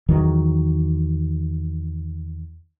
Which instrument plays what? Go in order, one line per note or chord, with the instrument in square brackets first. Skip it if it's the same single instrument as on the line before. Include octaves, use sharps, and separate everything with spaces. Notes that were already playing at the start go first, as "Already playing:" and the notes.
[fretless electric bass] E2 D#3 F#3